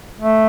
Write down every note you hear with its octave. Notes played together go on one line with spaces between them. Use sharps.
A3